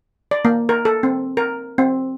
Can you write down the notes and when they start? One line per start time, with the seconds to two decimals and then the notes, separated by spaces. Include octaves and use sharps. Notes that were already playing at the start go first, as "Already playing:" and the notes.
0.31 D5
0.45 A#3
0.69 A#4
0.85 A4
1.03 C4
1.37 A#4
1.78 C4